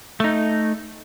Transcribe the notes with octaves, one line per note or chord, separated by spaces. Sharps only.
A3 D#4